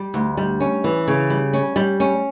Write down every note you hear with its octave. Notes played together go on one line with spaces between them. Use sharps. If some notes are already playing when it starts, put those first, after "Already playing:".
Already playing: G3
D2
G3
C#4
E3
C#3
G3
C#4
G3
C#4